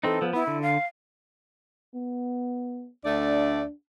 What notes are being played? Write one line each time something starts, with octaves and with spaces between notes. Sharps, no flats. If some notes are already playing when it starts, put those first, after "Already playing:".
E3 C4 D#4 A4
F3 B3
B3 E4
D3
F5
B3
D2 A3 D4 D5